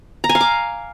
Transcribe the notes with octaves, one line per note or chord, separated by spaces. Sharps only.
A#5
G#5
F5
D6